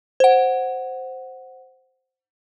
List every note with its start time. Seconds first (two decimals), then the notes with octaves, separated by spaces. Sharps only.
0.20 C5 F#5